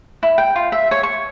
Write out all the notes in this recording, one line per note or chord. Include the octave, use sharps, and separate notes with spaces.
E4
G5
F4
E5
C#5
C#6